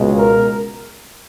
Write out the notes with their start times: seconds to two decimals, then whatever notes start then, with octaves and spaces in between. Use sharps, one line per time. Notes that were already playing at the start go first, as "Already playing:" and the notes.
Already playing: C#2 B2 G#3
0.17 A#4